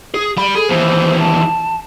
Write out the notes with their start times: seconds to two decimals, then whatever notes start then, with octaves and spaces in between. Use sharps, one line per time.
0.14 G#4
0.37 G3 B5
0.55 G#4 A4
0.69 D#2 E3 C5
1.20 A5